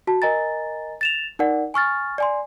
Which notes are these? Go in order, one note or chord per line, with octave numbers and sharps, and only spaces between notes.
F#4 A5
A#4 D#5 G#5 A#5 A6
A6 E7 F7
D#4 A#4 D5 F#5
G#5 C#6 F6 A6
D5 G#5 C6